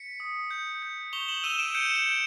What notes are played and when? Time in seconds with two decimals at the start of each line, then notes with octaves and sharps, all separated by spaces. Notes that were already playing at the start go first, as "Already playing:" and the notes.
Already playing: B6 C#7
0.20 D#6
0.51 G6
0.82 G6
1.13 C#6 F7 G7
1.28 E7 F#7
1.44 E6 D#7 F7
1.59 D7 E7
1.75 G6 C#7 D#7
1.95 D7 E7
2.06 G6